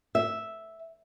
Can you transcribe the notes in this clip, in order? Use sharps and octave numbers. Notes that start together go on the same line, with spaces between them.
E5